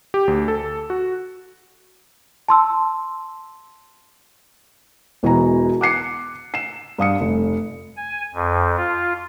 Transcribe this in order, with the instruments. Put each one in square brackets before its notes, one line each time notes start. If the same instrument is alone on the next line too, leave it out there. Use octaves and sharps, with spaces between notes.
[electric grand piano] G4
D2
A4
F#4
[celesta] A5 C6 E6
[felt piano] E1 B2 E3 B4 G#5 A#5
D6 F#6 C7 C#7
C7 E7
G2 F5 D#6 C#7
F1
[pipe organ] G#5
F2
F4